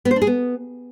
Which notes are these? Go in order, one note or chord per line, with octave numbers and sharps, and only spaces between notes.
B3
C5
D4
G#4
B3